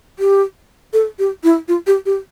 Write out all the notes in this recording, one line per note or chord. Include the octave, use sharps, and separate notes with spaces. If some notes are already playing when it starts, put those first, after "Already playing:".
G4
A4
G4
E4
F4
G4
G4